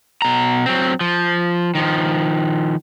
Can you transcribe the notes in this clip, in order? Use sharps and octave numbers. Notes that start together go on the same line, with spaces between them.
B2 A#5
F#3 C4
F3
D#3 F3